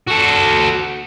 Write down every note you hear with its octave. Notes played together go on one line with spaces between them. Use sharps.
F#4 A4